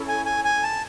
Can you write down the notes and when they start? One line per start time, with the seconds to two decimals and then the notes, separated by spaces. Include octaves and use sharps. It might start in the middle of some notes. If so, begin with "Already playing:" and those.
Already playing: C#4 E4 A4
0.08 G#5
0.26 G#5
0.44 G#5
0.63 A5